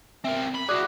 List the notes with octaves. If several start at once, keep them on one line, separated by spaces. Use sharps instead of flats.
C4 A#4 E5
B5
F#4 G#4 D5 D6 F#6